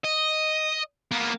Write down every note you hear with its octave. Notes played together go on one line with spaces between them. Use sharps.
D#5
A#3 B3